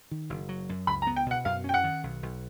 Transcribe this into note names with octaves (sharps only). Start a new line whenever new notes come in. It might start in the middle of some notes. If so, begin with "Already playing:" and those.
D#3
F#1
F#3
F#2
C#2 B5
A#5
B3
G5
B2 F#5
F#2 F5
C#4 G5
F#5
D#3
B1
B1